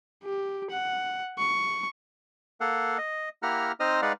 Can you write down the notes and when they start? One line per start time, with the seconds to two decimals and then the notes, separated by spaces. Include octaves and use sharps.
0.24 G4
0.70 F#5
1.38 C#6
2.61 A#3 A4 F5 F#5
2.98 D#5
3.43 A#3 E4 G4 F#5 A#5 F6
3.80 C4 D#4 C5 D#5 D#6 F6
4.02 G#3 D#4 B4 D5 F5 F#5